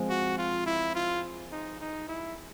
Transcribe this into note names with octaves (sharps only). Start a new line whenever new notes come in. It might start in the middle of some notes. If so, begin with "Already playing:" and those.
Already playing: F3 G#3 C4
F#4
F4
E4
F4
D#4
D#4
E4